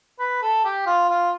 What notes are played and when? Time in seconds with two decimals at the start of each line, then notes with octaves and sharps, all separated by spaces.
0.19 B4
0.42 A4
0.65 G4
0.86 F4
1.09 F4